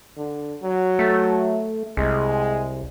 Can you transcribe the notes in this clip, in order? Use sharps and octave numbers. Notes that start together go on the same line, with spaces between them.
D3
F#3
A3
C2 G#3